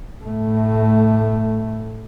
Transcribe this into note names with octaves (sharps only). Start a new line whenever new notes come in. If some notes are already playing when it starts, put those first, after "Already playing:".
A2 A3